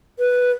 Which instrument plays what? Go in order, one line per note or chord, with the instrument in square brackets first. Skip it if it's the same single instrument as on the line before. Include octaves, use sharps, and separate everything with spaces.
[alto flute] B4